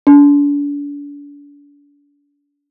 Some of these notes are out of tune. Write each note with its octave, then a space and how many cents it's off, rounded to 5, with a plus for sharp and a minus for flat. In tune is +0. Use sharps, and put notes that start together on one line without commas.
D4 -35